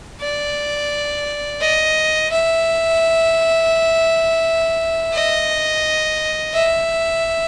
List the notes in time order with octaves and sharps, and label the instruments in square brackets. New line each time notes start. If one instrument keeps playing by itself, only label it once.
[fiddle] D5
D#5
E5
D#5
E5